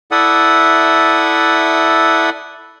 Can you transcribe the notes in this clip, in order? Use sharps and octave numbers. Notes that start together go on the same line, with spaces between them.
E4 A4 D5 E5 F#5 D#6